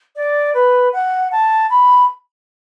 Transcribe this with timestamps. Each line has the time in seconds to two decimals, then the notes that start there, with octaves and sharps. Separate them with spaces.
0.16 D5
0.54 B4
0.93 F#5
1.32 A5
1.70 B5